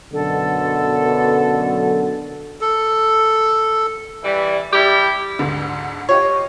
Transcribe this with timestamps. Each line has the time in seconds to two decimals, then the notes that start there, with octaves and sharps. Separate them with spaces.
0.13 F#2 B2 D3 A4
2.61 A4
4.24 E3 G3
4.73 G3 E4 G4
5.39 D2 G#2 D3
6.09 F4 G4 C#5 D#5